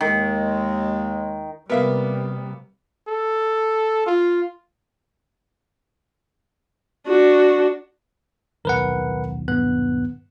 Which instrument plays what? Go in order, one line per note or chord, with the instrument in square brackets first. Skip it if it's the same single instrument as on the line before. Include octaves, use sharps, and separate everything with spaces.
[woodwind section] D#2 G#3 [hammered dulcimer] D#3
[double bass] C3 G3 [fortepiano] A#3 B3 [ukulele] A#4 E5 F5
[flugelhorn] A4
F4
[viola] D4 F#4
[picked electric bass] D#1 B1 D#3 [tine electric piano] A#4 B4 F#5
[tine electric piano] G2 B3 F#6